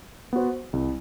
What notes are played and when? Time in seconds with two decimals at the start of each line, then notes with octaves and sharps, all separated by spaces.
0.33 B3 F#4 C5
0.73 C2